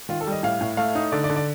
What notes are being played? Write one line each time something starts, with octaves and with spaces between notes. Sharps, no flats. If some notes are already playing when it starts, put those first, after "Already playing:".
D#3 F4
A4
G3 D#5
A2 F5
A2
A3 F5
D#4
D3 D5
D5
D3
D5